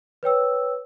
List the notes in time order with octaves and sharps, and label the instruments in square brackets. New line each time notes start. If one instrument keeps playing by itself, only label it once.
[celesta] B4 C#5 G5 E6